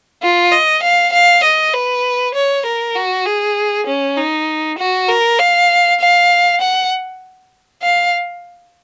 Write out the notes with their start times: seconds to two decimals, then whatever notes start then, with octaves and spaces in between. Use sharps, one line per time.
0.22 F4
0.52 D#5
0.83 F5
1.13 F5
1.44 D#5
1.74 B4
2.34 C#5
2.66 A#4
2.95 F#4
3.26 G#4
3.87 C#4
4.17 D#4
4.78 F#4
5.09 A#4
5.39 F5
6.00 F5
6.61 F#5
7.82 F5